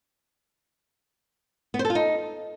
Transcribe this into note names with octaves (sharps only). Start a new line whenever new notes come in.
B3
C5
A4
F4
D#4